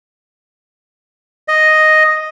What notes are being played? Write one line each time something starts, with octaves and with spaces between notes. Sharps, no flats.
D#5